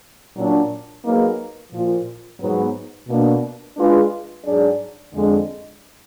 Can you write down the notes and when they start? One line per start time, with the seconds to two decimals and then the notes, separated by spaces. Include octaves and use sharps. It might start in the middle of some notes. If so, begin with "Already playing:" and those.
0.36 A#2 F#3 D4
1.04 F#3 A#3 D#4 G#4 B4
1.72 A#2 F3 A#3 F4
2.40 G#2 F#3 B3
3.08 B2 A#3 D4
3.76 G#3 D4 F4 G#4 B4
4.44 G#2 F#3 D4 G#4 D5
5.12 F2 D3 G#3 D4